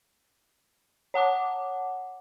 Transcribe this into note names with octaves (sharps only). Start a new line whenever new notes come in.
C#5 F#5 A5 D6